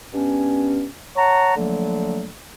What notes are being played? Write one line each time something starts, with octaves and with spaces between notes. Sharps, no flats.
G2 B3 C#4
C#5 F#5 A5 A#5
D3 F3 F#3 A3 A#3